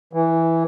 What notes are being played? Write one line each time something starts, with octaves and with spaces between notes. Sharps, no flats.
E3